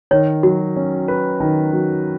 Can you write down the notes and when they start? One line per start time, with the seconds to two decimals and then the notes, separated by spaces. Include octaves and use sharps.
0.11 D#3 C#5
0.43 F#3 F#4
0.76 C#4
1.08 B4
1.40 D#3
1.72 F#3